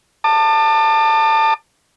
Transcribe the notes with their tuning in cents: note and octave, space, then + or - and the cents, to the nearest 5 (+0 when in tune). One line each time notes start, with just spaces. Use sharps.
A5 +20 D6 +40